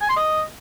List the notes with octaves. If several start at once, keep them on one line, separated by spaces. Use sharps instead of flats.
G#5
C6
D#5